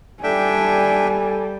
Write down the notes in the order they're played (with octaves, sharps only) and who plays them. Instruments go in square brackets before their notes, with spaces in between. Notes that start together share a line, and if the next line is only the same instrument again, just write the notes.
[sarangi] G3 [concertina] D4 E5 G5 [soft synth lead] A4 [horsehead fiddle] G#5